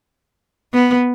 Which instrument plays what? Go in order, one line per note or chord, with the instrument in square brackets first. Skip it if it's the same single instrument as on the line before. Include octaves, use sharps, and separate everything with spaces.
[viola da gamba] B3